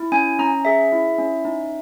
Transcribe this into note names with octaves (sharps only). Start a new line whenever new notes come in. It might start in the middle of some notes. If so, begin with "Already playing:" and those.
Already playing: E4
C#4 G#5
C#4 A#5
G#4 E5
E4
C#4
D#4